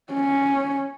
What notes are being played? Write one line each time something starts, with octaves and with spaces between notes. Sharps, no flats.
C#4